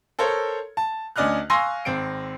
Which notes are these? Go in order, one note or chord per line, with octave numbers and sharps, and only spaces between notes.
A4 A#4 C5 C#5
A5
D2 C#4 D5 D#5 F6 F#6
F5 G#5 C6 C#6 E6 A#6
G#1 C4 D7